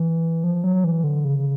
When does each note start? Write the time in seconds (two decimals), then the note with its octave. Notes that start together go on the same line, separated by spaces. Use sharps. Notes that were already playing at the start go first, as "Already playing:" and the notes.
Already playing: E3
0.44 F3
0.64 F#3
0.84 E3
1.04 D3
1.25 C#3